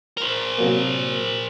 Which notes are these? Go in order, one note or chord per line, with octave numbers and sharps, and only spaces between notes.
A#4 C5
C3 F#3 A#3